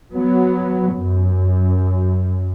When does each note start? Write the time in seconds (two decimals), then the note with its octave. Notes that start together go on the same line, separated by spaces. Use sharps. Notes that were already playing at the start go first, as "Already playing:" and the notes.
0.13 F#3 B3
0.95 F#2